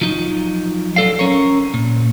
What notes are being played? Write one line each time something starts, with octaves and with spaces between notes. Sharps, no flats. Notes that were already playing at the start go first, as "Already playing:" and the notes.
F3 F#3 D#4
F3 F#3 A#3 A4 D5 F5
C#4 A#4 C#5
A#2